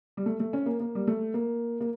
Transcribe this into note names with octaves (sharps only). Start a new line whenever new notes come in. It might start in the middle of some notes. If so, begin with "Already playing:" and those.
G3
A3
A3
C#4
A#3
A#3
G3
A3
A#3
A#3